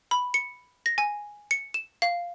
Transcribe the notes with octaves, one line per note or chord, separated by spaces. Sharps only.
B5
C#7
A#6
G#5
C#7
E7
F5